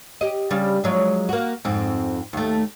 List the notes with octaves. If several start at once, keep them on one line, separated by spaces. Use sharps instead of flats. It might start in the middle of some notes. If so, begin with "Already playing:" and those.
G4 D#5
C#3 G3
F3 F#3 G#3
A#3 F#4
F2 G#2 C4
D#2 A3